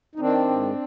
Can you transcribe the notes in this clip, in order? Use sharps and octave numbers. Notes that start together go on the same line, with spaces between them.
D#4
D#3 C4 D4
G#2